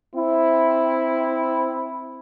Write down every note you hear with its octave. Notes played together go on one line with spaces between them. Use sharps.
C4 E4